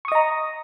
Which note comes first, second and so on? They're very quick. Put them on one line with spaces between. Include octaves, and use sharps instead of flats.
C#6 D#6 D#5 A#5